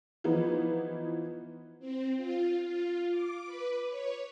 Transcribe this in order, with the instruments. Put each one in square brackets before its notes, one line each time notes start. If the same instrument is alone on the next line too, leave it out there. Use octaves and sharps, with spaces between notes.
[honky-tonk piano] E3 F3 B3 D#4
[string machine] C4
F4
F4
D6
B4
C#5